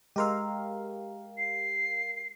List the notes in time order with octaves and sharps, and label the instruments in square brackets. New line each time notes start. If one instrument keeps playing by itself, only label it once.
[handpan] G#3 [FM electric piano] G4 A#4 F5 [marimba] D#5 C6 E6
[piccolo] C7